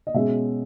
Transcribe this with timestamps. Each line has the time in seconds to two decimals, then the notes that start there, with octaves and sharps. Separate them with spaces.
0.07 D#5
0.14 B2 G#3 C#4 E5